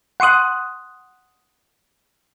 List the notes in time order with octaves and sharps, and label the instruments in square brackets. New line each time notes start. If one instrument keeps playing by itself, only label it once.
[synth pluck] F#5 C6 C#6 D#6 F#6